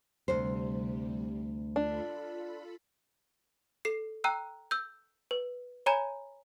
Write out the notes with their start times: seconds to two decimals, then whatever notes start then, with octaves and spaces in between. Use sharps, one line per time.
0.28 D2 C3 G3 C5
1.76 D4 F4 A4 B5
3.85 A4 C7
4.24 G5 A#5 E6 F#6
4.71 E6 G6
5.31 B4
5.86 C#5 G#5 A#5 B5 G#6